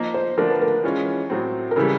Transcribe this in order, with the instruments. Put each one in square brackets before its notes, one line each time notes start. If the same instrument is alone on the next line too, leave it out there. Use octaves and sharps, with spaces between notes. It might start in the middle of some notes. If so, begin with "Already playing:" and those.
Already playing: [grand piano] F3 A#3 D#4
[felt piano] C5
[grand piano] D3 F3 A3 D4 [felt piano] A#4
[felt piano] B4
A#4
[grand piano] E3 G#3 C#4 F4
A2 F#3 A3 C4
[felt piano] A#4
[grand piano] C#3 E3 G3 [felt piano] A4